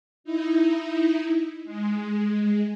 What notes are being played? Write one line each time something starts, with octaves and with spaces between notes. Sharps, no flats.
D#4 E4
G#3